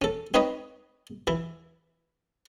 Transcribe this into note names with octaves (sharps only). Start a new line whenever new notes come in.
C#4 A4
C4 D#4 B4 C#5 D#5
E3 E4